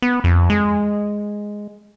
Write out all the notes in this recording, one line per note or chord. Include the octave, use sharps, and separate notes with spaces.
B3
F2
G#3